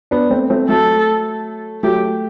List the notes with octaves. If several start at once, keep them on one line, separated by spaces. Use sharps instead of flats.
B3 D4
A3 C4
A3 C4
F#3 A3 A4
F#3 A3 G4